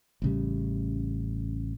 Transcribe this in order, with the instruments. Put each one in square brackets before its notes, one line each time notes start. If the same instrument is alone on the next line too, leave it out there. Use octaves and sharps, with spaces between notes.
[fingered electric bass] A1 C#3 G3